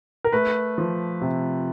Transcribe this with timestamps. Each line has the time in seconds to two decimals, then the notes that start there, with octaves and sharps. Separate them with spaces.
0.24 A#4
0.33 A3 B4
0.78 F3
1.21 C3